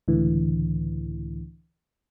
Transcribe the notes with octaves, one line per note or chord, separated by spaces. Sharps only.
C#2 A2 D3 E3